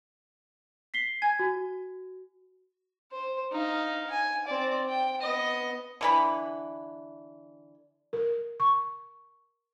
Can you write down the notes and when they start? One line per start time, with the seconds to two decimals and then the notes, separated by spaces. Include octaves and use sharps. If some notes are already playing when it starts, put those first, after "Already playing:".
0.94 B6 C7 G7
1.22 G#5 G#6
1.39 F#4
3.12 C5
3.52 D#4 F5
4.11 G#5
4.47 C4 D5
4.89 G5
5.21 B3 D#5
6.01 D3 E3 B5
8.13 A#4
8.60 C#6